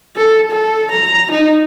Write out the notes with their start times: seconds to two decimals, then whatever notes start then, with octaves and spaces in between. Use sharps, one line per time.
0.16 A4
0.51 A4
0.91 A#5
1.31 D#4